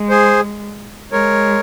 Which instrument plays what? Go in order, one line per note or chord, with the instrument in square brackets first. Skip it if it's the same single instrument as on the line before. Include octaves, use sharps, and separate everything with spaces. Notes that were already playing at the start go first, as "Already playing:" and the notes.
Already playing: [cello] G#3
[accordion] G#4 C5
[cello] G#3 [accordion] A#4 C#5